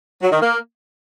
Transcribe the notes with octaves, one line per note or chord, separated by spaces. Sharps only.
F#3
D#3
A#3